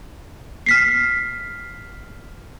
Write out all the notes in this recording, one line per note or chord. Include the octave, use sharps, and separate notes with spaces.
F6 B6 C7